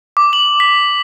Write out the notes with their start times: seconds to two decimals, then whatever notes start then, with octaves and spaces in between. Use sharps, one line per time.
0.17 D6
0.33 F#7
0.60 B6